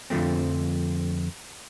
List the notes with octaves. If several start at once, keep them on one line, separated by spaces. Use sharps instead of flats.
F2 D3 F3 A3 C4